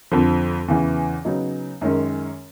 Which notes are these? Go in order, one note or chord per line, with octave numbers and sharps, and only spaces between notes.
F2 D3 F3
E2 C#3 E3
C#3 F#3 B3 D#4
F#2 D#3 G#3 C#4